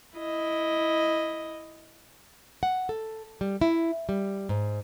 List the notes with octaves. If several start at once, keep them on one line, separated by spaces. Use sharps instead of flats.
E4 D#5
F#5
A4
G3
E4
G3
G#2